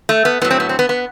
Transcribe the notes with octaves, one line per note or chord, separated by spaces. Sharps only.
A3
B3
A2 F#3 B3
C4
B3
C4
B3
B3